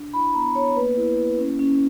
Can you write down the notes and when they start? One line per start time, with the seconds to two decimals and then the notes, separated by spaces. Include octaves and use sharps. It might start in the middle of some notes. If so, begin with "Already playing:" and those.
Already playing: D4
0.13 E4 B5
0.34 B3 A#5
0.55 B3 C#5
0.76 A#3 B4
0.97 E4
1.18 A#3
1.39 C#4
1.59 C#4